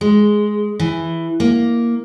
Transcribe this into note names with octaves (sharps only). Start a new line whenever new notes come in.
G#3
E3
A#3